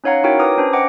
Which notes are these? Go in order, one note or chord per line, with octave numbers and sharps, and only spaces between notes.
C#4 D#4 C#5 F5 F#5 A#5
D#4 E4 F#4 A#4 C#5 G5
B4 A#5 D6 D#6 F6
C#4 D4 C5
D#5 F#5 G5 D6